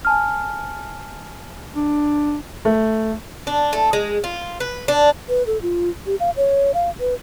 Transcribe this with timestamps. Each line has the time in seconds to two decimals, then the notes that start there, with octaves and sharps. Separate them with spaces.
0.05 G#5 A5 F6
1.75 D4
2.65 A3
3.47 D4
3.73 A3
3.93 G#3
4.24 F4
4.60 B4
4.88 D4
5.29 B4
5.47 A4
5.62 F4
6.06 G4
6.20 F5
6.37 C#5
6.74 F5
7.00 B4